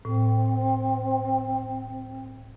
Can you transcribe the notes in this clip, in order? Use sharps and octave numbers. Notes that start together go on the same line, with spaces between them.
A2 C4